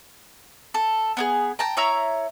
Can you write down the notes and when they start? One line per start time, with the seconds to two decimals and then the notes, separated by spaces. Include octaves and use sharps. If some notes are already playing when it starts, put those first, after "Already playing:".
0.74 A4
1.17 B3 D4 G#4
1.59 G5 A5 A#5
1.77 E4 C#5 A#5 E6